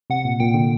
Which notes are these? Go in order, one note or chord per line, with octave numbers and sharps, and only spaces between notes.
C3 F#5
A#2
A#2 G5
D3